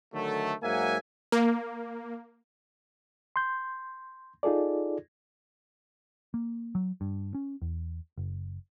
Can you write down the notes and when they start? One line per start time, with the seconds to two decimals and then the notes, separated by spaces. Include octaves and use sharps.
0.13 D3 D#3 F#3 A3
0.63 G#2 F#3 A#3 E5 F#5 G#5
1.32 A#3
3.36 C6 G6
4.43 D#4 F4 G#4 A4 D5
6.34 A#3
6.75 F#3
7.01 G2
7.35 C#4
7.62 E2
8.17 F#1